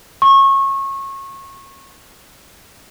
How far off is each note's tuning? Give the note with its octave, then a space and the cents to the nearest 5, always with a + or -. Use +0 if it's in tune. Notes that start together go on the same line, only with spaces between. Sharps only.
C#6 -25